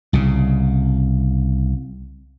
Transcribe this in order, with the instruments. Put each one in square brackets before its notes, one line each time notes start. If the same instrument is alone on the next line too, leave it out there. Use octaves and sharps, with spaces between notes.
[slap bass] C2 C#3